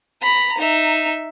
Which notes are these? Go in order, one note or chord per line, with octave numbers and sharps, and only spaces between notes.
A#5 B5
D#4 E5